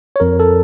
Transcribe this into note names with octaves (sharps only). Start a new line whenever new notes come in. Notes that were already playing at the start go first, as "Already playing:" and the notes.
C#5
F2 A#4
A4